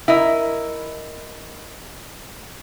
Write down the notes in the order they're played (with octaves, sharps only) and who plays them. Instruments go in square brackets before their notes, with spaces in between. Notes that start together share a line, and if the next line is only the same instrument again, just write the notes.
[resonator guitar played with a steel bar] E4 A#4 D#5